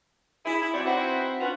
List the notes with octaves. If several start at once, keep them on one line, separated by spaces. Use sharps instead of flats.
E4 G#4
E4
F#3 C4 G4 C#5 D5
C4 D#4 E4 F#4 B4 C5
C#4 D4 F4 F#4 B4